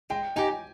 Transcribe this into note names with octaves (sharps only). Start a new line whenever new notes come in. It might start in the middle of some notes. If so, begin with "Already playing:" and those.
G#3 G5
D#4 G4 G#5